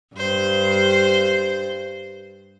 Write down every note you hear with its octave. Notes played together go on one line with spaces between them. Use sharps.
G2 C5